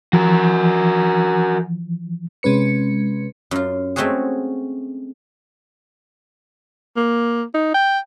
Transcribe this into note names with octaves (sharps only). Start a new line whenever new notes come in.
E3 F3 F#4 A#4
C3 G#3 C#4 B4 C#7
F#2 F4
G#3 A3 C4 C#4 F#4 G#4
A#3
D#4
G5